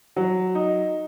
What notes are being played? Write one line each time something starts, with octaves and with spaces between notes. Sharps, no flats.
F#3
D#4